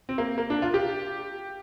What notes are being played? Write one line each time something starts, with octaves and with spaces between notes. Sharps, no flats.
C4
A#3
A#3
D4
F4
G4